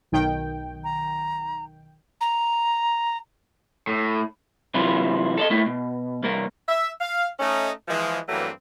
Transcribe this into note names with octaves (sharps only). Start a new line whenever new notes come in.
B1 D#3 G5
A#5
A#5
A2
C3 E3 F#3 E4 F4
A4 D5 D#5
A3 A#3 E4
B2
C2 A#3 A#4
E5
F5
A3 C#4 D#4
E3 F3 G#3
G2 E3 F#3 A3 A#3 C4